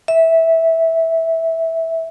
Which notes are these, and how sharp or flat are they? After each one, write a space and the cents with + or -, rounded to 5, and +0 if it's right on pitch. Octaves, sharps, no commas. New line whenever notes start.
E5 -10